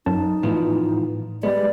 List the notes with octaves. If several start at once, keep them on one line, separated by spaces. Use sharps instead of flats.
F#2 D#4 A5
A2 E3 F3 B3
G3 G#3 B3 D5